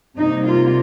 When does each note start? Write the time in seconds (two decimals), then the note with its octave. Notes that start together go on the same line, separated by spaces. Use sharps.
0.16 C3 G3 A#3 D#4
0.45 F4